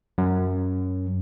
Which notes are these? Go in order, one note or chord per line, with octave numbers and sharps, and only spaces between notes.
F#2